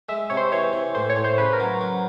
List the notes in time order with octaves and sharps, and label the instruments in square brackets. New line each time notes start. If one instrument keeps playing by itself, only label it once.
[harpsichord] G#3 [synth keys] E5
[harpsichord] C3 [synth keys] C#5
[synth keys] C5
[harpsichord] E3 [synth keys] C#5
[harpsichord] E3
[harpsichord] A2 [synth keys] C5
[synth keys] C#5
[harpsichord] A2
[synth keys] C5
[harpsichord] C#3 [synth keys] B4
[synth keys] A#4
[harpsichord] F#3
F#3